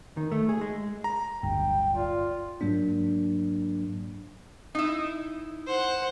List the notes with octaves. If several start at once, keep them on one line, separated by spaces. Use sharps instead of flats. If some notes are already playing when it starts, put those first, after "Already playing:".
D#3
A3
G#4
G#3
A#5
D1 G1 G2 G5
F4 D5
G#2 F#3 A#3 D4
D#4 E4
C5 F#5